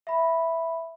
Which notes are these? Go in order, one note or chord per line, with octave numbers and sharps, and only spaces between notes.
E5 B5